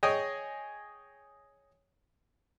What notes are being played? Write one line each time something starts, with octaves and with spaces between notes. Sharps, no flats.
G#4 C#5 D#5 G5 G#5